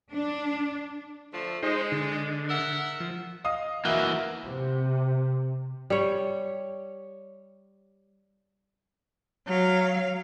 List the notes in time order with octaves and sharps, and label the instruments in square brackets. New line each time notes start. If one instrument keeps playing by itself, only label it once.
[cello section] D4
[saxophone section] D3 F3 A3
[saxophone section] G#3 [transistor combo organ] D#4 C5
[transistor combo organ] D3
[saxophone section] A#4 E5 F#5
[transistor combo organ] F3
[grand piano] D#5 F5 D#6
[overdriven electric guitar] E3 A#3 [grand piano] F#4 F#6 G7 [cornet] E5
[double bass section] C3
[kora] G3 C#5
[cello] F#3 F5